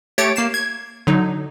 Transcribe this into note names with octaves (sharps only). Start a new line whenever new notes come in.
A3 G4 C#5 A6 C#7 D7
A#3 C7 E7
G#6
D3 F#3 D#4